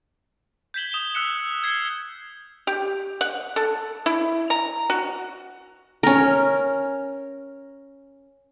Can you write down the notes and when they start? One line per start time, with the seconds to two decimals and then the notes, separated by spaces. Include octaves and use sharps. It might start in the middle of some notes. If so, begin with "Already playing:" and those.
0.74 G6 G#6 B6 E7 F#7 G7
0.92 D#6 E7 F#7 G7
1.15 E6 F#6 G6 B6 C#7 E7
1.63 F6 G#6 C7 C#7
2.67 G4
3.21 F#5
3.56 A4
4.06 E4
4.50 A#5
4.90 F#4
6.03 C#4 A#4